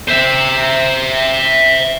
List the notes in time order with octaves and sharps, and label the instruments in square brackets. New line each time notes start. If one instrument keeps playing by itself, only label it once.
[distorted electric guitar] C5 E5